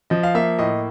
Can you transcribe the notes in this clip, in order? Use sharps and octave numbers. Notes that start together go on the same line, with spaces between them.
F3 D#5
F5
A#3 E5
A2 D#5